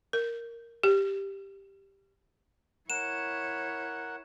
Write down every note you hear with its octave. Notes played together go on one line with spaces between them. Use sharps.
A#4
G4
E4 A#4 C#5 F#5 E7